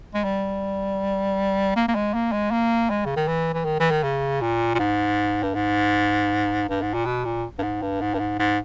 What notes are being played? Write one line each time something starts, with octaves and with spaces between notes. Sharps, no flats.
G#3
G3
A#3
A#3
G#3
A#3
G#3
A#3
G#3
C#3
D#3
E3
E3
D#3
E3
D#3
C#3
A#2
A#2
G#2
G2
G#2
G2
G#2
A#2
B2
A#2
G2
G#2
G2
G#2
G2
G#2
G#2